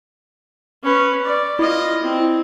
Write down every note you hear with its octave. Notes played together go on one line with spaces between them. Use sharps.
C#4 B4
D5
E4 F4 D#5
C4